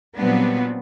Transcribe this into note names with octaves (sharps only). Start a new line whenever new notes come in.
A#2 F#3 G3 B3 C4 D4